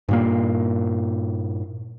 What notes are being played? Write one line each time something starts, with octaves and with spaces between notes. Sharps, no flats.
G2 A#2 A#3